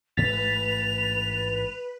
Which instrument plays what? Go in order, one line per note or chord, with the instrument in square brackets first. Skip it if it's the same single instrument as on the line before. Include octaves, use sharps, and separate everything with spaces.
[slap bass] A1 G#2 A3 [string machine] B4 [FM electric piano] A6 B6 [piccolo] F7